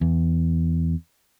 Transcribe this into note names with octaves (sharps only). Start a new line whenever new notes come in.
E2